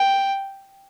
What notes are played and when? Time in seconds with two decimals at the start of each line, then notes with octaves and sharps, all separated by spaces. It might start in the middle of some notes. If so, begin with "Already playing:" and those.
Already playing: G5